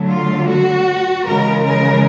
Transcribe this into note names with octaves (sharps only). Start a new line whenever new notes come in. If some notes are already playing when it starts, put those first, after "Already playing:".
Already playing: D3 F#3 A3
F4
F#4
C#3 E3 G#3 A#4
A#4